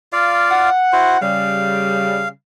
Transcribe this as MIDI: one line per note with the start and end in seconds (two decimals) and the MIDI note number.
0.13 0.70 65
0.13 0.70 74
0.13 0.70 77
0.51 1.19 78
0.93 1.17 64
0.93 1.17 66
0.93 1.17 72
1.21 2.28 49
1.21 2.28 55
1.21 2.28 77